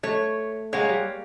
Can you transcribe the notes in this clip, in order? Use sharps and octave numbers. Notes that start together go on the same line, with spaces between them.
A3 C#5
G#3 A#3 A#4 C#5 F5 F#5
G3